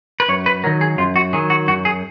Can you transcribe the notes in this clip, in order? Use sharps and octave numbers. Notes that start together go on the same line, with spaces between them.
B4
F#2 C#5
B4
D#3 F#3 A#4
G#4
F#2 F4
F#4
D#3 F#3 G#4
F#4
F#2 F#4
G#4